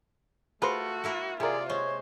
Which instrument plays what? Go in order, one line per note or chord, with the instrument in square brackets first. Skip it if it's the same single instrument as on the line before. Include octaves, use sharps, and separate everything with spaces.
[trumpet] A3 [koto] F4 [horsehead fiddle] F#4 [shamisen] G#4 B4 C5
[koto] A#3 E4 A#4
[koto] C3 [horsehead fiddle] F4 D5 [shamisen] G4 A#4 [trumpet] G#4
[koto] G#3 [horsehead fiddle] C5 [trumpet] C#5